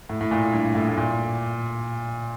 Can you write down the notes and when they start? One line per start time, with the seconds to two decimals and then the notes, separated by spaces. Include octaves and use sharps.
0.09 A2
0.21 A2
0.31 A#2
0.53 G2
0.75 A2
0.89 A2
0.97 A#2